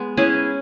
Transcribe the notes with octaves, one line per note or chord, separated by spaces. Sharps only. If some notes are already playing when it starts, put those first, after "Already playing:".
Already playing: G#3 B3
C#4 E4 G#4 B4